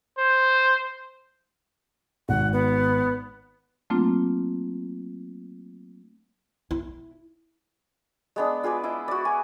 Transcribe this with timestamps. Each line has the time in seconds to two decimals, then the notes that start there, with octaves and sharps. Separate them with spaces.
0.18 C5
2.29 G#1 F#5
2.53 B3
3.90 F#3 A3 A#3 C4 D4 F4
6.71 E4
8.36 G#3 B3 D4
8.63 F4 G#4 B4 D5
8.84 E4 D#5
9.08 F#4 D5
9.25 G#5